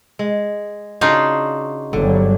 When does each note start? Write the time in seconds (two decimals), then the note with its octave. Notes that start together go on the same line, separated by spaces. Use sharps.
0.19 G#3
1.01 C#3 D4 D#4 F4 F#4
1.93 G1 D3 F#3 G3